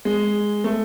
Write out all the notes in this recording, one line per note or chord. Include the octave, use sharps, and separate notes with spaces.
G#3
A3